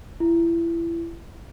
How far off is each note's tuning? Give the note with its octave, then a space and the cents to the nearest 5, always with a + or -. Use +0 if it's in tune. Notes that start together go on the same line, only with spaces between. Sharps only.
E4 +25